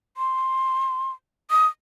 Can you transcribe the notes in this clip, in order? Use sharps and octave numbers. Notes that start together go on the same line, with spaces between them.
C6
D#6